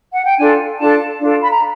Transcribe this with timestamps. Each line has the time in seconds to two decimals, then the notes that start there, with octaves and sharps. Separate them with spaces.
0.12 F#5
0.24 G5
0.38 D4 F4 A4 G#5
0.78 D4 F4 A4 A5
1.19 D4 F4 A4
1.43 B5
1.51 A#5